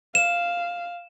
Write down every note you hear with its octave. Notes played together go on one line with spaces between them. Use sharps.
F5 E7